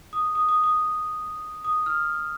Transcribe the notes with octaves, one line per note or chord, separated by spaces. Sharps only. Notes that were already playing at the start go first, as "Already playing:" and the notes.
D#6
D#6
D#6
D#6
D#6
F6